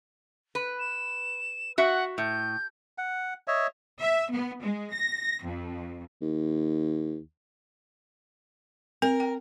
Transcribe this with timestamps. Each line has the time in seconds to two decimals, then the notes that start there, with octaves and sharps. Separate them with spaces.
0.55 B4
0.79 E7
1.78 F#4 E5 F#5
2.18 A2 G6
2.98 F#5
3.48 C#5 D#5 E5
4.01 E5
4.31 B3
4.62 G#3
4.93 A#6
5.44 F2
6.22 D#2
9.02 C4 A#4
9.20 G5